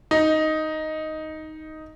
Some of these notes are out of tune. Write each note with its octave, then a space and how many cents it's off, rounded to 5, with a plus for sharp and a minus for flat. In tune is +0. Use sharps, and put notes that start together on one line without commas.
D#4 +5